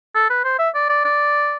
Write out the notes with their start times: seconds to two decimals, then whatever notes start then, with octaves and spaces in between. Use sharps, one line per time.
0.15 A4
0.30 B4
0.44 C5
0.59 E5
0.75 D5
0.89 D5
1.05 D5